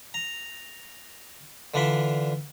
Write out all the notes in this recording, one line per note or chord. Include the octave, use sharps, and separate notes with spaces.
A#5
D3 E3 D4 F4 B5 C6